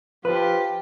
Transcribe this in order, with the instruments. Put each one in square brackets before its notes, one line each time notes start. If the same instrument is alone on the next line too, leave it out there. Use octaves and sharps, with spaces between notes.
[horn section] F3 F4 [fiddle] G4 [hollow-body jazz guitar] B4